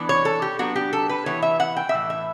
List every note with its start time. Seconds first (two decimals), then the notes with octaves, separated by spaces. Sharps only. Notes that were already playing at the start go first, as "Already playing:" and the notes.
Already playing: E3 B3 D4
0.09 C#5
0.25 A4
0.42 G4
0.59 F#3 B3 D4 F#4
0.76 G4
0.93 A4
1.09 B4
1.26 E3 B3 E4 C#5
1.42 E5
1.60 F#5
1.77 G5
1.89 E5
1.94 A2 E3
2.10 E5